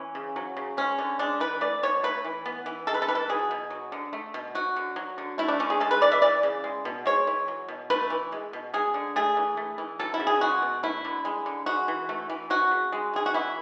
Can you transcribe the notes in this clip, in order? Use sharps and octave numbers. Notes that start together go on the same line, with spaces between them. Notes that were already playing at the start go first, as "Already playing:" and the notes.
Already playing: E3 C#4
C#3
F#3
C#3
G#3 C#4
D3
G#3 D4
E3 B4
A3 D5
B2 C#5
A3 B4
E3
B3
E3
G#3 A4
B4
A4
E3 B4
A4
F#3 G#4
B2
F#3
D3
A3
B2
F#3 F#4
D3
F#3
D3
A3 E4
D4
D3 C#4
G#4
G#3 A4
B4
E3 D5
E5
E3 D5
C#3
G#3
B2
G#3 C#5
E3
F#3
B2
A3 B4
E3
G#3
B2
G#3 G#4
D3
A3 G#4
E3
A3
E3
F#3 A4
E4
C#3
G#4
G#3 F#4
B2
A3 E4
D3
G#3
D3
G#3 F#4
E3
A3
E3
F#3 F#4
C#3
G#3
E3 G#4
F#4
E3 E4